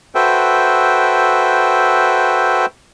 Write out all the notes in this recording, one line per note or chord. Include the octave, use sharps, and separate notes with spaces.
F#4 A4 B4 C5 E5 G5